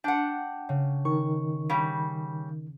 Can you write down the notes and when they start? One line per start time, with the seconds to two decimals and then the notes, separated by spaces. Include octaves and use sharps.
0.04 D4 F#5 G5
0.69 C#3
1.05 D#3 C#6
1.69 C#3 G3